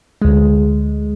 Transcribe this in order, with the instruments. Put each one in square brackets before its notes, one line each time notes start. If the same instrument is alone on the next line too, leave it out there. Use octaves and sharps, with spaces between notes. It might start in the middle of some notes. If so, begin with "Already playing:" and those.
[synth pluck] D2 G#3